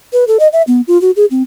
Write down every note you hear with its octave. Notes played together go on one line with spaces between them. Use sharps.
B4
A4
D#5
E5
B3
F4
F#4
G#4
C4